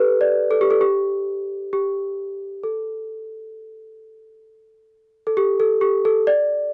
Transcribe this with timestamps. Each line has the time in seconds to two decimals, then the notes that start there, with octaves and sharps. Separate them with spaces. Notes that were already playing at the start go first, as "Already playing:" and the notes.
Already playing: G4 A4 B4
0.21 D5
0.51 A4
0.61 G4
0.71 A4
0.81 G4
1.73 G4
2.63 A4
5.27 A4
5.37 G4
5.60 A4
5.81 G4
6.05 A4
6.27 D5